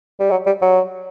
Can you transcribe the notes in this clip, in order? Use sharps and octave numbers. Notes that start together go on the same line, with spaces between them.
G3
F#3
G3
F#3